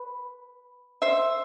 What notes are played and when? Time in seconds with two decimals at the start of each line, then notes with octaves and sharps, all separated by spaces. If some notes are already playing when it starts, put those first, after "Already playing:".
Already playing: B4
1.02 C5 E5